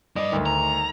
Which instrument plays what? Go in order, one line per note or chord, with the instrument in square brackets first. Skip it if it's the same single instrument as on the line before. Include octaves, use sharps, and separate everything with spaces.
[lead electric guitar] G2 D5 [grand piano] D#5
[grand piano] D2 D#3
[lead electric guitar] A#5